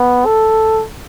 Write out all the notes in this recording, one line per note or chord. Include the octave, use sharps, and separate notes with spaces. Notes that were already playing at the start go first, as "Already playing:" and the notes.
Already playing: B3
A4